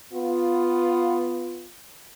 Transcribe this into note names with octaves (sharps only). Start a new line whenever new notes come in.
B3 F4